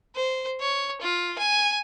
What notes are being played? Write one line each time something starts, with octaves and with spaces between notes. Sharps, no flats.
C5
C#5
F4
G#5